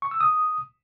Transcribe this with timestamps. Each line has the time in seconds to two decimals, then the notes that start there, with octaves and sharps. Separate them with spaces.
0.02 C#6
0.11 E6
0.21 D#6